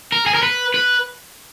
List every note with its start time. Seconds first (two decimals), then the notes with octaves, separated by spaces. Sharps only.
0.12 A#4
0.26 G#4
0.35 A#4
0.43 B4
0.74 B4